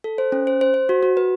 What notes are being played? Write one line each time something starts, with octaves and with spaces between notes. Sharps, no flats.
A4
C5
C#4
C5
C5
C5
F#4
F#4
B4